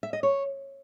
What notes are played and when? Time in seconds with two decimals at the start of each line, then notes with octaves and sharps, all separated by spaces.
0.03 E5
0.13 D#5
0.23 C#5